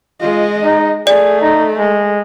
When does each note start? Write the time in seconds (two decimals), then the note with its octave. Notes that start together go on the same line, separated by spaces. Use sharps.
0.21 G#3 F4 D#5
0.63 D#4
1.07 A3 G#4 D5
1.41 D#4
1.78 G#3